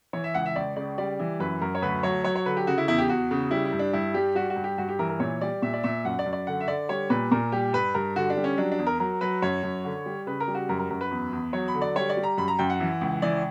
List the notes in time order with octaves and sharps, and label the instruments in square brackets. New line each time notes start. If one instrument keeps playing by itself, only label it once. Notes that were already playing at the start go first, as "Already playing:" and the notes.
[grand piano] E3 C#5
E5
C#2 F#5
E5
C#2 D5
C#3 D5
G3 D5
E3
F#2 B4
F#2 A#4
C#5
D2 B4
F#3 C#5
F#3 C#5
C#5
D3 B4
G4
C#3 F#4
E4
E2 E4
G4
E2 F#4
C#3
G3 E4
E4
G2
D4
G2 E4
G3 G4
G3 F#4
F#4
G2
G4
G2 F#4
G4
E3 A#4
A#4
A#2 C#5
G3 D5
A#2 E5
D5
A#2 E5
F#2 F#5
D5
F#2
D5
D3 F#5
E5
D3 D5
G3 C#5
A#2 B4
A#2 A#4
G3 G4
G2 B4
G2 A#4
D3 F#4
D4
G3
C#4
F#3 D4
D4
E2
A#4
F#3 A#4
F#3 B4
F#2 C#5
F#2
D3
G3
C#3 B4
A#4
G3
F#4
F#2 A#4
A#4
F#2 A#4
B4
E2
E2
F#3 C#5
B5
D3
D5
G3 C#5
D5
G3
A#5
F#2 B5
A#5
F#2 G5
F#5
E3
C#2
E3 D5